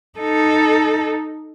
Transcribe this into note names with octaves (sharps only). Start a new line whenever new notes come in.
D#4 A4